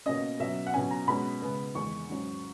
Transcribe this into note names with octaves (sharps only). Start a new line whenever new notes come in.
B2 A#3 C#4 D#5
B2 F#3 C#4 E5
F#5
B2 F#3 C#4 G#5
A#5
B2 G#3 C#4 B5
C#3 G#3 B3
E2 D#3 G#3 C#6
G#2 F#3 C#4